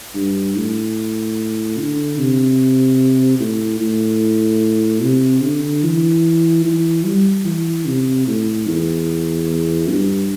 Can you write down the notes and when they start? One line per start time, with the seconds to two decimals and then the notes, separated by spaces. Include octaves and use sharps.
0.15 G2
0.56 A2
1.78 D3
2.18 C3
3.39 A2
3.80 A2
5.01 C3
5.43 D3
5.83 E3
6.65 E3
7.05 G3
7.45 E3
7.87 C3
8.27 A2
8.68 E2
9.89 G2